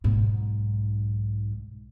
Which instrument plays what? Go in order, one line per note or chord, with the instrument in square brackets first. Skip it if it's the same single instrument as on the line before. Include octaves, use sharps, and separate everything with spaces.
[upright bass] B1 G#2